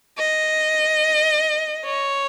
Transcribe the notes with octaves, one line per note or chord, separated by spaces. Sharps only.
D#5
C#5